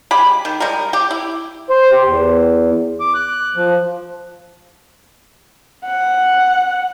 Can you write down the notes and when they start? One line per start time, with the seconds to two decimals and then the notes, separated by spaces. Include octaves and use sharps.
0.11 G#3 G4 B5
0.45 D#3
0.60 G3 G#3 A#4
0.93 G4
1.11 E4
1.70 C5
1.92 G4
2.05 E2
3.00 D6
3.15 F#6
3.56 F3
5.85 F#5